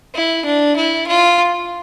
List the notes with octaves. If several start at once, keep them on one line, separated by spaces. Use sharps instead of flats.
E4
D4
E4
F4